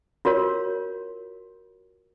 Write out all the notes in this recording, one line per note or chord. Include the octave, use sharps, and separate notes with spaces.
F4 F#4 A#4 C#5